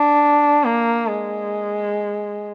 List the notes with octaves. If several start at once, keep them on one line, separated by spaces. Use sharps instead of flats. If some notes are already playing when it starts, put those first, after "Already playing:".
Already playing: D4
A#3
G#3